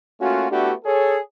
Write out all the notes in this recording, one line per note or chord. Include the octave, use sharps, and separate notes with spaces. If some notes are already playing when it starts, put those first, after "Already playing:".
A3 A#3 C#4 F4 F#4
A3 B3 D4 E4 F#4 G4
G#4 A4 C#5